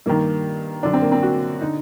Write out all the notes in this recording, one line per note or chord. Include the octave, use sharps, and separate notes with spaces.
G2 D#3 A#3
F#2 D3 D4
C4
A#3
C4
F#4
D3 D#4